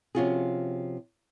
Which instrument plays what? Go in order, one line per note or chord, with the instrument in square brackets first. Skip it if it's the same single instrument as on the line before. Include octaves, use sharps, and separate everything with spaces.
[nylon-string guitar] C3 F3 C#4 F4 F#4 G#4